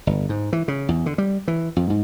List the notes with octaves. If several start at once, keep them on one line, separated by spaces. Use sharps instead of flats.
G1
G#2
E3
C#3
E2
D3
G3
E3
F2
G#2